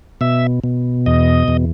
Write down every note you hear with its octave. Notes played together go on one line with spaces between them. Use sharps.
B2 E5
B2
E2 D#5
E2